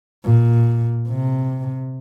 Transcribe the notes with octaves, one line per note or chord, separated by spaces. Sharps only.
A#2
C3